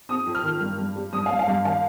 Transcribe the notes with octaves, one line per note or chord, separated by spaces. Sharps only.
C4 D#6
F2
F6
D#3
G2
G2
G3
G2 D#6
G2 F5
F5
G2
D#3 F5